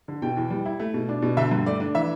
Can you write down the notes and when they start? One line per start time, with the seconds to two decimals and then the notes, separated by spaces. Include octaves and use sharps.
0.08 D3
0.22 B2 G5
0.37 E2
0.50 G3
0.66 E4
0.80 A3
0.94 B2
1.09 D4
1.22 B2
1.37 D3 E5
1.51 G2
1.66 A3 D5
1.80 D4
1.95 E3 E5